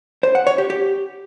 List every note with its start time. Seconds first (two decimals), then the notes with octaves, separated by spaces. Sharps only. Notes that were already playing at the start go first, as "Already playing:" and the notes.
0.23 C5
0.35 F#5
0.47 C#5
0.58 G4
0.70 G4